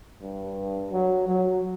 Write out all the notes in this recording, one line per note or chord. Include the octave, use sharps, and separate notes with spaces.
G2
F#3
F#3